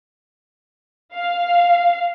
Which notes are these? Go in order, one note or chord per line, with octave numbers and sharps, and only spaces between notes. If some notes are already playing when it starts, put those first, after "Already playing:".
F5